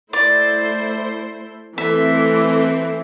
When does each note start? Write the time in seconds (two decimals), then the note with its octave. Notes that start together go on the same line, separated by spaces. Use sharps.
0.13 A3 E4 C5 D5
1.77 E3 A3 C4 E5